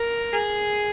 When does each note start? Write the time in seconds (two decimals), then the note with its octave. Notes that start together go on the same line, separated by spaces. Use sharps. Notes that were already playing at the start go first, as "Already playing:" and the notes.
Already playing: A#4
0.32 G#4